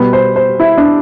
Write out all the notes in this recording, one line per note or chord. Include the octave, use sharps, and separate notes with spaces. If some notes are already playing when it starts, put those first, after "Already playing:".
Already playing: B2 G3 B4
C5
C5
E4
D4